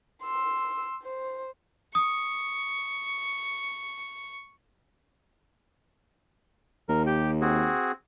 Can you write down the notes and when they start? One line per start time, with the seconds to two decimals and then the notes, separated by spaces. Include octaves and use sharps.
0.23 C6 E6
1.02 C5
1.95 C#6 D#6
6.89 D#2 A#4
7.07 G4 G5
7.41 C4 F#4 G#4